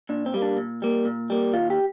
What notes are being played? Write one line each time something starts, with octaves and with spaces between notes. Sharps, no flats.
A#2 D4
C4
G3 A#3
D4
A#2
G3 A#3
A#2
G3 A#3
D#2 F4
G4